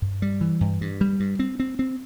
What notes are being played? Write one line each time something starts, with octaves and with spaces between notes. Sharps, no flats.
G2
G3
E3
G2
G2
G3
G2
C4
C4
C4